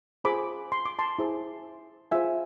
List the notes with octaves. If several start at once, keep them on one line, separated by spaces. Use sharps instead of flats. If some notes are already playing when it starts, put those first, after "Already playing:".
F4 G#4 C5 B5 D6
C6
D6
A5 C6
E4 G#4 C5
F4 G#4 C5 E5 G#5